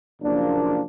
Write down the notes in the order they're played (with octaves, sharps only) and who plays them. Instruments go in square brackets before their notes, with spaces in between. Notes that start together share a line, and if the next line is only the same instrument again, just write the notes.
[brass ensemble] F#1 F3 A#3 D4